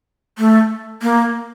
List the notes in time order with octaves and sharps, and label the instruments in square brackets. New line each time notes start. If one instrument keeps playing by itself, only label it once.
[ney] A3
A#3